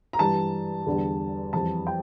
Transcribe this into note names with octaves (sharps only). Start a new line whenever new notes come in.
A#5
G2 E3 G3 A5
E2 D3 G3
F2 E3 G3 A5
G5